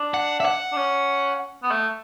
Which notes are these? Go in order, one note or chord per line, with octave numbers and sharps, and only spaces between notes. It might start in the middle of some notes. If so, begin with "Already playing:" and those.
Already playing: D4
F#5
E5
F#5
D4
C#4
B3
A3